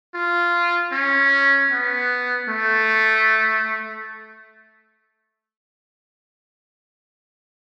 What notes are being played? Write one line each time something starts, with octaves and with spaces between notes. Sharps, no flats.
F4
C#4
B3
A3